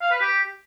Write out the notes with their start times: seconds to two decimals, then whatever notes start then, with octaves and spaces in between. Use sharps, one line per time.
0.01 F5
0.11 B4
0.21 G4